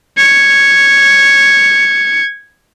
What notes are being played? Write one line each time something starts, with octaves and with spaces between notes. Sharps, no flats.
G#6 C#7